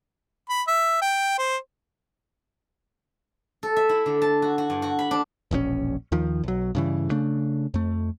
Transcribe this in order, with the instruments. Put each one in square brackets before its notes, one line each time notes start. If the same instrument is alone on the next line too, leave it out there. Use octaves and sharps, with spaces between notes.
[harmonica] B5
E5
G5
C5
[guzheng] A4
E5
E4
D3
A5
F#4
F#4
G2
F#4
B5
D4
[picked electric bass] E1 A#1 C3 C#4
D#2 D#3 F3
B1 F#3
G2 C#3 E3
C#3 A3 D4
F2 A3